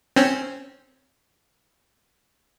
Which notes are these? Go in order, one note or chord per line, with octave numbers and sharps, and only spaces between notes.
C4 C#4